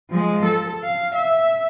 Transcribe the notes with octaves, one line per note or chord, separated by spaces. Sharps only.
F3 G#3
A4
F5
E5